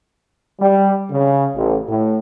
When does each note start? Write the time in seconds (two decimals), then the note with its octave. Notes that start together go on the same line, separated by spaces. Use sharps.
0.60 G3
1.12 C#3
1.56 A1
1.89 A2